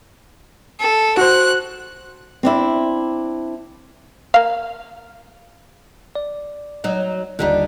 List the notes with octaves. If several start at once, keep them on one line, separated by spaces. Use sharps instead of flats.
A4
F#4 C5 F#6
C4 D4 E4
A#3 F5
D5
F#3 D#4
G1 D#2 D3 G3 D#4